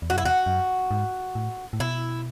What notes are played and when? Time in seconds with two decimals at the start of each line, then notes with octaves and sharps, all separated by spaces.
0.02 E2
0.10 F#4
0.13 F#2 E4
0.24 E2 F#4
0.46 F#2
0.91 G#2
1.35 A2
1.73 A2
1.80 B2 E4